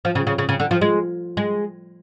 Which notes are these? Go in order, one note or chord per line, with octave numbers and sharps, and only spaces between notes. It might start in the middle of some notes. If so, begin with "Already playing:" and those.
F3
C#3
C#3
C#3
C#3
D3
F3
G#3
G#3